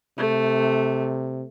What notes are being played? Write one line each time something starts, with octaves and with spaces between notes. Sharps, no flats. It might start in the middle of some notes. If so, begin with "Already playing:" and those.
C3 A3